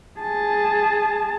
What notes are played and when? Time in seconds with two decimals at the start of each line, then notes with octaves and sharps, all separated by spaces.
0.20 G#4 A5